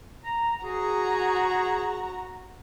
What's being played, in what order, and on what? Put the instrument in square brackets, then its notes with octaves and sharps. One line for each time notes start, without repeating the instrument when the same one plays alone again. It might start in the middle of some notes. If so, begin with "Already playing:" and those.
[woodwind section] A#5
[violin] F#4 A#5 [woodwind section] G#4